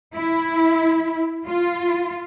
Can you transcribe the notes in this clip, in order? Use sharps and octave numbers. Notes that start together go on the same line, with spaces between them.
E4
F4